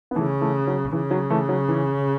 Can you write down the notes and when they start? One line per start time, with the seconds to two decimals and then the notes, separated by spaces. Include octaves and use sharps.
0.11 B3
0.15 C#3 E3 A3
0.41 E3 A3
0.67 F#3
0.92 C#3 E3
1.11 F#3
1.30 E3 A3
1.49 F#3
1.69 E3